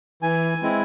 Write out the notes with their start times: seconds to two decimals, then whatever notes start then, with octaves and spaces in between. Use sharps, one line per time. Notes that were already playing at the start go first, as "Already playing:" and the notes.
0.22 E3 G#5
0.62 G#3 C4 E4